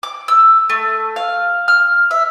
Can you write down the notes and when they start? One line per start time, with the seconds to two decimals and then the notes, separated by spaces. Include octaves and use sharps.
0.03 D6
0.28 E6
0.70 A3
1.16 F5
1.68 F6
2.11 E5